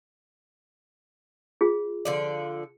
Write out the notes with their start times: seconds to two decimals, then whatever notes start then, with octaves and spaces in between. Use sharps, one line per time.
1.61 F4 G#4
2.05 D3 F3 D5